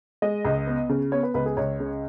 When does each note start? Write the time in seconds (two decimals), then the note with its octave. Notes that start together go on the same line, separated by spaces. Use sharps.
0.22 G#3 D#5
0.45 C#2
0.67 B3
0.89 C#3
1.12 B3 C#5
1.23 B4
1.34 C#2 B4
1.46 G#4
1.57 C#2 C#5
1.80 C#3